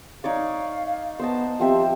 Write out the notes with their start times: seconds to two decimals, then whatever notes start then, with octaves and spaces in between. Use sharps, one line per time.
0.24 D#4 C#5 D5 F5
1.19 B3 C5 D#5 A5
1.60 F3 C4 G4 E5